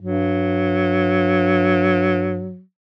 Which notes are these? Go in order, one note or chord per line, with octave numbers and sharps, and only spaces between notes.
G2 F#3